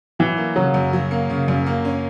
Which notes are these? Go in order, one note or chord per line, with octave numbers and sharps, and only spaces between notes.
E3 F#3
A#3
C#3 F#3
F#2
F#3
A#3
C#3
F#2
A#3
C#4